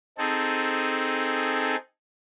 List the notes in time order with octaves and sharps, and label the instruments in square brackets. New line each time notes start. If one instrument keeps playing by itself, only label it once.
[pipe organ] C4 D#4 G#4 A4